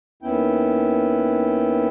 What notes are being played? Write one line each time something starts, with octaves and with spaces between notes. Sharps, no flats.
D#2 B3 C#4 E4 G5